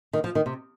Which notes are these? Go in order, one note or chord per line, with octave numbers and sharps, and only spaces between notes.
D#3
F3
D#3
C3